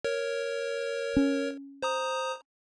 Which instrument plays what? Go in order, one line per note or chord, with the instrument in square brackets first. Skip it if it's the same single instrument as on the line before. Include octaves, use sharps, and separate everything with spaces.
[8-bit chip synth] A#4 C#5
[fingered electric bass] C#4
[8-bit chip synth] C5 A#5 D#6